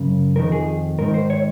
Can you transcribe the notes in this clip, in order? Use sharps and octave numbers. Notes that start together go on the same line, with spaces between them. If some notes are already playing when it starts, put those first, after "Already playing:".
Already playing: F#2 C#3
F2 D#3 A#4
G#4
G#2 D#3 A#4
C5
C#5